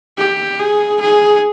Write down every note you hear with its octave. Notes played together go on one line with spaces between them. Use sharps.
G4
G#4
G#4